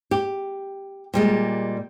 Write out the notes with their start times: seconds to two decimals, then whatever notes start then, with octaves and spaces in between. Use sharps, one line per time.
0.11 G4
1.14 A#2 G3 G#3